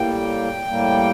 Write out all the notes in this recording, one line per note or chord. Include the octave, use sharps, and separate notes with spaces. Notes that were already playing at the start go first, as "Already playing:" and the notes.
Already playing: A2 G3 A#3 G5
A2 G3 A#3